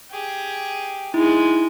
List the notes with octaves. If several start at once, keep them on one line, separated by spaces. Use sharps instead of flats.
G4 G#4
G#3 D#4 E4 G#4